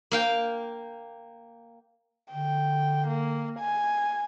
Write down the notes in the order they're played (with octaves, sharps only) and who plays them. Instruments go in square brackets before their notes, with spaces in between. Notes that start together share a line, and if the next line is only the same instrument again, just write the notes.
[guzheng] A#3 F5 G5
[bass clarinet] D3 [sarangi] G5
[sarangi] A#3
G#5